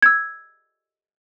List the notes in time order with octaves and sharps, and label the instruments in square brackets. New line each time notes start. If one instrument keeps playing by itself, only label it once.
[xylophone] E6 G#6